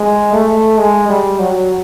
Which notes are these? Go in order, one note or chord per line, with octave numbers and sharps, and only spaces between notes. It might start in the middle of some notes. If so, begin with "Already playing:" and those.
Already playing: G#3
A3
G#3
G3
F#3